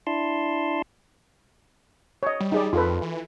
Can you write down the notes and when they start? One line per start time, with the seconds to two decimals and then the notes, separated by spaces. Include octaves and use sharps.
0.07 D4 E4 A5 C6
2.23 C#5 D#5
2.40 G3
2.52 D#4 G#4 D5
2.73 F2 F4 A4 B4
3.02 E3